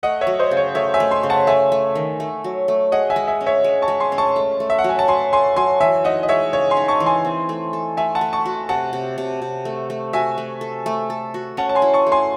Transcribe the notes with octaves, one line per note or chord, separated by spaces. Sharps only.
A3 D#5 F#5
C#5 E5
F#3
C5 D#5
C#3
C#5
A3 C#5 E5
E5 G#5
A3
G#5 C6
C#3
F#5 A5
A3 E5 G#5
A3
D#3
A3
F#3
A3
G#4 D#5 F#5
E5 G#5
G#3
E5 G#5
C#4
C#5 E5
G#3
A5 C#6
G#3
G#5 C6
C#4
A5 C#6
A3
A3
E5
F#5
F#3 G#5
A5
F#3 G#5 C6
A3 G#5 C6
F#3 G#5 C6
E3 E5 G#5
D#4 D#5 F#5
D#5
G#3 C#5 E5
C#3 C#5
G#5 C6
D#4
A5 C#6
E3
G#5 C6
C4
A3
A4
A3 E5 G#5
F#5 A5
A3
A5 C#6
F#4
C3 F#5 A5
C3
C3
C3
A3
A3
F#4 E5 G#5
A3
A4
A3
A4
F#4
C#4 F#5 A5
A5
G#5 C6
E4
A5 C#6
A3
G#5 C6